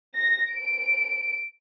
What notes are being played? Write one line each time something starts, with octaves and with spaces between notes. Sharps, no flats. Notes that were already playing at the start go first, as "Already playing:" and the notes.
A#6
D7